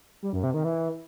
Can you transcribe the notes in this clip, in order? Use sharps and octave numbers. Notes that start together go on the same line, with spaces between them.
G3
F#2
C3
D#3
E3